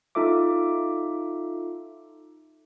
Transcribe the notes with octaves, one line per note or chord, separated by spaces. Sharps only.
D#4 F4 A4 E5 D6